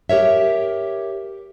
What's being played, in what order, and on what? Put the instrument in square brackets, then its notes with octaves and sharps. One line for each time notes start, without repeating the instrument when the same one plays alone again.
[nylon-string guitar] G4 A#4 C#5 E5